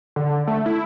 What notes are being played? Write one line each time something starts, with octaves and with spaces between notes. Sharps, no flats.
D3
A3
E4